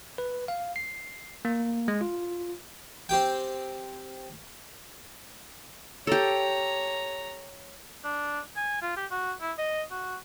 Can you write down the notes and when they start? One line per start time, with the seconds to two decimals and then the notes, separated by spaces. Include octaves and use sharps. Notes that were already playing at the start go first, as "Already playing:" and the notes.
0.18 B4
0.48 F5
0.76 C7
1.45 A#3
1.88 G#3
2.01 F4
3.09 C4 G4 G5
6.07 G4 A4 C#5 A#5
8.05 D4
8.56 G#5
8.82 F4
8.97 G4
9.11 F#4
9.41 E4
9.58 D#5
9.91 F#4